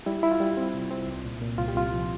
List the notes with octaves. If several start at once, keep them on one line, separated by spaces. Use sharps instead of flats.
G3 E4
E4
F4
G3
C4
C3
C4
C2
A#2
A#2
C2 F4
G4
C2 F4
F3